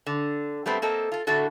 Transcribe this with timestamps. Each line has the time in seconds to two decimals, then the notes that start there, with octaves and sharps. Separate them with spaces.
0.06 D3
0.66 G3 A3 B3 C4
0.82 A#3 C4 A4 D#5
1.12 F4 A4
1.27 A2 D3 A3 F#4 A4